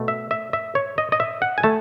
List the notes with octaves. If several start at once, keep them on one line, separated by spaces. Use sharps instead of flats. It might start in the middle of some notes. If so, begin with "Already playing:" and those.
Already playing: B2 A3
E5
E5
E5
C#5
D#5
D#5
E5
F#5
G#5
A3 A5